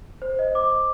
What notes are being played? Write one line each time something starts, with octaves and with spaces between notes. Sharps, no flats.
C5
D#5
D6
D6